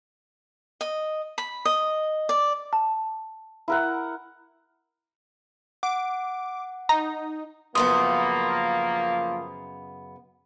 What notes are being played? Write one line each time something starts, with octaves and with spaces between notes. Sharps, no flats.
D#5
B5
D#5
D5
A5
E4 A#4 F#5
F#5 D6
D#4 A#5
F#2 C#3 F3 A#3 B3 C6 D#6